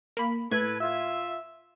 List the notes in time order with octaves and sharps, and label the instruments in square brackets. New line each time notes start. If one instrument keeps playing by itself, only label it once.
[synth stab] A#3 B5
[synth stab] A2 G#6 [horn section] A4 B4
[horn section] F4 E5